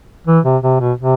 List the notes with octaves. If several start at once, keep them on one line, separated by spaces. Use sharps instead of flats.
E3
C3
C3
B2
C3